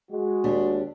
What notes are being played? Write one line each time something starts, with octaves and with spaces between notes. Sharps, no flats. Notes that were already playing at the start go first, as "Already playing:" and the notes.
G#3 F#4
D#2 D4 G4